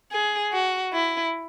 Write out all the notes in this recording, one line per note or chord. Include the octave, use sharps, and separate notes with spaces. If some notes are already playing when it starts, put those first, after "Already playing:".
G#4
F#4
E4